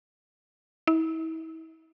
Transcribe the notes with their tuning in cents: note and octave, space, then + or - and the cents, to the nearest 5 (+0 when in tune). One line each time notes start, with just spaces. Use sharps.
E4 -35